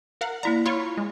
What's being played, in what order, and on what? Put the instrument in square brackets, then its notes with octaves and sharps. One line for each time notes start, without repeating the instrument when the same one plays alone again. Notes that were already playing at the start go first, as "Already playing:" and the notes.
[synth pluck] A#4 F5 F#5
[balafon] A#3 E4 D5 [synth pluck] A#5
[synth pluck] F4 C#5 C#6 [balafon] B5
[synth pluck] G#3